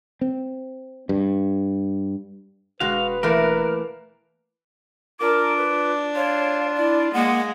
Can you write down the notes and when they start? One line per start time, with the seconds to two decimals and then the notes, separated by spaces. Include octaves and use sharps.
0.21 C4
1.09 G2
2.80 E1 G#3 F#4 B4 F5
3.23 E3 A3 A#3 A#4
5.20 D4 F4 A#4 D6
5.57 B4
6.16 F4 C#5 F5
6.77 E4 D5
7.14 G#3 A#3 F#5